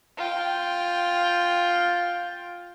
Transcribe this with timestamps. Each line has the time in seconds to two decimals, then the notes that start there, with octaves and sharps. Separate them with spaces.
0.18 F4 G5